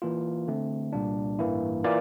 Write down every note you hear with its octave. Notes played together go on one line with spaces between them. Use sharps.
E3 A#3 F4
D3 A3 C4
C2 A#2 G3 A#3 D4
A1 G2 E3 A#3 E4
E3 A#3 F4 A#4 D5